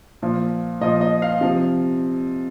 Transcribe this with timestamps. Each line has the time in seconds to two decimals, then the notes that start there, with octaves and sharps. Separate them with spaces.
0.22 A#2 F3
0.81 A#2 F3 D#5
1.01 D#5
1.22 F5
1.41 C3 F3